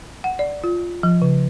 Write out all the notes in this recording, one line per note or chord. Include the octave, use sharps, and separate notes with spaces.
F#5
D5
F4
F3
C#3